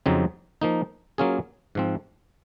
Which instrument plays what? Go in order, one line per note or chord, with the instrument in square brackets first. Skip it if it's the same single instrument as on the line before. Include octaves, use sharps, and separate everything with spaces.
[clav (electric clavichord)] F2 C#3 F#3 C4 D#4
F3 A#3 D#4
F#3 A#3 C#4 F4 G#4
G#2 F3 C4